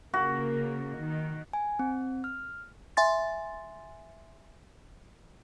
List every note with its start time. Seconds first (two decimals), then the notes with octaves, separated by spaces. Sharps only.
0.14 C#3 A#3 F#4
1.01 D#3
1.53 G#5
1.79 C4
2.24 F6
2.97 E5 G#5 C6 A6